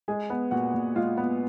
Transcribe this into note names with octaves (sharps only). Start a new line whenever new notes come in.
G#3 G#4 G#5
B3
A#2 F#4 F#5
A#2
G#3 F4 F5
B3